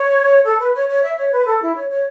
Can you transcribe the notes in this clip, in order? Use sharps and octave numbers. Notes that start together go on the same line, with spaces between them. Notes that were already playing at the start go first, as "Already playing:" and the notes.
Already playing: C#5
A4
B4
C#5
C#5
E5
C#5
B4
A4
E4
C#5
C#5